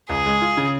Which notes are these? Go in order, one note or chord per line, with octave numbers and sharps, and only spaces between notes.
C#2 G#4
G#3
F4
C#3